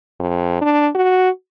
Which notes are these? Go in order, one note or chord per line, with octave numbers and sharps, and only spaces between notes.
F2
D4
F#4